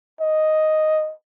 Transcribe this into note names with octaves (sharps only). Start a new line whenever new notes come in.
D#5